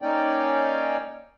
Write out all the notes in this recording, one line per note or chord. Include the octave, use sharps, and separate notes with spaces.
A#3 C#4 D#4 D5 G5